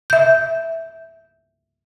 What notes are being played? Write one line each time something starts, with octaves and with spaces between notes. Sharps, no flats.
E5 G6